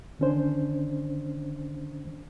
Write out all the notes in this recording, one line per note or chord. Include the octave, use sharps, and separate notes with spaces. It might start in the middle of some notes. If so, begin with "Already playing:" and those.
D3 D#3 C#4 D4 C5